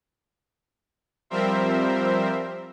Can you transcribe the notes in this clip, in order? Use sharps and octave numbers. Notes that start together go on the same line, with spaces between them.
F3 G3 C4 A#4 C5 E5